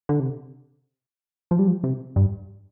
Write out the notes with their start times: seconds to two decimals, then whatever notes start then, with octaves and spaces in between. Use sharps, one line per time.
0.09 D3
0.20 C3
1.51 F3
1.59 G3
1.68 F3
1.84 C3
2.16 G2